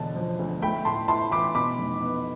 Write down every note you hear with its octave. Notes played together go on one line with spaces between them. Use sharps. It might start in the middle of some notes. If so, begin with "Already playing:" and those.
Already playing: E1 B2 D3 A5
F3
D2
A3 G5 B5
A2 A5 C6
E4 A5 C6
E3 B5 D6
B2 B5 D6
F1
B3